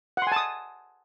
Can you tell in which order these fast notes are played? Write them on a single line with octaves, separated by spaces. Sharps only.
F#5 C6 G#5 A5 D#6